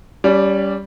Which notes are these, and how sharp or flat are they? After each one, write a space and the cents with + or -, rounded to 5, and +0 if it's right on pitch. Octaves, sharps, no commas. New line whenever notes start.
G3 +0 C#4 +30 D5 +0